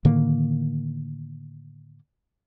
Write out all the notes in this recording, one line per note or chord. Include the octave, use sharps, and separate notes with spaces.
A2 D3 D#3 A#3